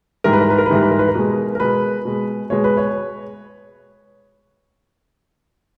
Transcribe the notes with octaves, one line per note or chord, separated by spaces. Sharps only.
G#2 E3 G3 A#4
B4
A#4
B4
A#4
B4
G#2 E3 G3 A#4
B4
A#4
B4
A#4
B2 G#3
A#4
B2 G#3 B4
B2 G#3
B2 G#3 C#5
B4
C#5